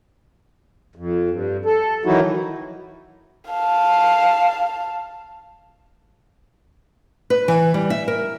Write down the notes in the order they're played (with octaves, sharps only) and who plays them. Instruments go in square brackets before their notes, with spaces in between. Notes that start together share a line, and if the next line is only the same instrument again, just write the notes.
[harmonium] F2
G2
A4
D#3 E3 F#3 D#4 E4 F#4
[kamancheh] F5 A5
[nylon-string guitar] B4
E3
G3
E5
A#4